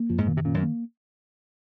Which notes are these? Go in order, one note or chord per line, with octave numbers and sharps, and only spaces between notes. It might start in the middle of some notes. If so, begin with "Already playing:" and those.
Already playing: A#3
F#2 F3
G#2
A#2 D#3
C3
A#2 C#4
F#2
A#3